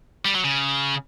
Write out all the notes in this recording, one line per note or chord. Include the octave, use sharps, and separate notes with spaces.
G3
F#3
C#3